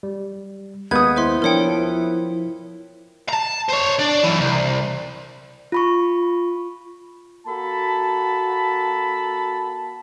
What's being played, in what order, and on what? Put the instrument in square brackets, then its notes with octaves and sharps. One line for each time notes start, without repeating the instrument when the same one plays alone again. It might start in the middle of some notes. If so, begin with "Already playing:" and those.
[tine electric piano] G3
[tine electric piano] D#2 G#3 A#3 [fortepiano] B3 D#6 [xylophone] G6 G#6
[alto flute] E4 [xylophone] C5 E5 C6
[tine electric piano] F3 D4 C#7 [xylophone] A#4 C#5 G5
[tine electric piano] F3
[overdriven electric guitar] A5 A#5
C5 C#5
D4 D5
F#2 E3
C2
[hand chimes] F4 B5 C#6
[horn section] A#3 F#4 A4 A5 B5